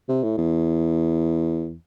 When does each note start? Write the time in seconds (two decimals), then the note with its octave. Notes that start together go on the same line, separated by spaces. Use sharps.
0.09 C3
0.23 A2
0.38 E2